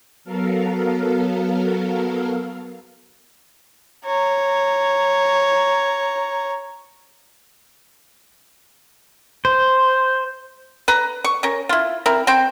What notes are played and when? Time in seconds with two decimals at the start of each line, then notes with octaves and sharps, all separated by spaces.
0.24 F#3 B3 A4 A#4 F5
4.05 C#5 A#5
9.45 C5
10.88 B4 A#5
11.24 C#6
11.43 C#4 A#4
11.69 E4 F4
12.06 C4 E4 A#4
12.27 C4 C5 G5